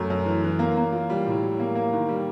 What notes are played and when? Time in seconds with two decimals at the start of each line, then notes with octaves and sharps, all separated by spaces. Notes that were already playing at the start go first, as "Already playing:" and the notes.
Already playing: F#2 A3
0.10 F#2
0.26 E3
0.44 E3
0.59 A#3
0.77 A#3
0.93 F4
1.10 G3
1.27 A2
1.43 F#3
1.60 A#3
1.75 A#3
1.93 D#3
2.09 G3